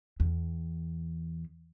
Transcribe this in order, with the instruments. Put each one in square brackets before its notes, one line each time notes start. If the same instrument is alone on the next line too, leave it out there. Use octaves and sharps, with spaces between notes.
[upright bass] E2